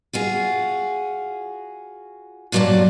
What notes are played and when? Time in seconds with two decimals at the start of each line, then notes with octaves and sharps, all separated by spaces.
0.13 F4 F#4 G#4
2.52 G2 A#2 F#3 G4 D5 A5